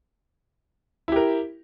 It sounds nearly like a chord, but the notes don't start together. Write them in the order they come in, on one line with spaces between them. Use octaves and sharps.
E4 G4 A#4